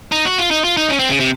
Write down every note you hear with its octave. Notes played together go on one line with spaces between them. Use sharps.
D#4
F#4
F4
D#4
F4
D#4
C#4
C4
C#3
C3